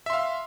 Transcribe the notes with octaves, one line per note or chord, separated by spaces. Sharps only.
E5 F5 C6